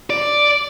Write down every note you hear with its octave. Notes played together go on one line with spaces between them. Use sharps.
D5